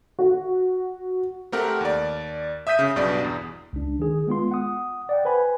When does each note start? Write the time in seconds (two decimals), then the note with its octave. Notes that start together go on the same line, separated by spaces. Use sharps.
0.19 F#4
1.52 A3 C4 G4 A#4 F#5
1.81 D#2 D5
2.67 E5 D#6 G6 B6 D#7
2.79 C#3
2.96 B1 G2 B2 D5
3.24 E2
3.73 C#2 D4
3.99 D#3 G#4
4.27 G#3 B3 F4 C6
4.51 F#5 D#6
5.09 D5 F#5 G5
5.25 B4 C5 G#5 B5